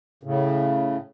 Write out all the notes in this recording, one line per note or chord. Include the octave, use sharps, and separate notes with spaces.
A2 C#3